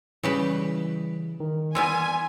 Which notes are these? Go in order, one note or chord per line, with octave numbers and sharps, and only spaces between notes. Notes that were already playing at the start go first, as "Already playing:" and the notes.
C#3 E3 G3 G4 B4
D#3
E3 G3 B3 G#5 C6